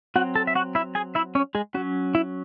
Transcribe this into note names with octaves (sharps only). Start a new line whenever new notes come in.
F#3 C4 F#4 F#5
A4 A5
E5
F#4 F#5
E4 E5
G#4 G#5
E4 E5
C#4 C#5
G#3 G#4
F#3 C#4 F#4
E4